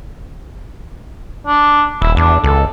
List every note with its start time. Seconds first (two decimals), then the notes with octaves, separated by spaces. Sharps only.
1.47 D4
2.02 D#1 E4
2.17 E2 D4
2.44 C#2 A4